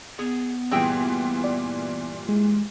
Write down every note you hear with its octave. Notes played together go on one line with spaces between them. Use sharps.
B3 G#4
G2 A#2 E3 C4 G#4 G5
D5
G#3